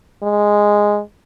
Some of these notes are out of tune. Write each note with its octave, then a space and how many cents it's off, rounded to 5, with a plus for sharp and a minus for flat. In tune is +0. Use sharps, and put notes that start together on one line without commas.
G#3 -5